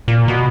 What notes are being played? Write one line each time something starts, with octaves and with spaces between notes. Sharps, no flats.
A#2
B2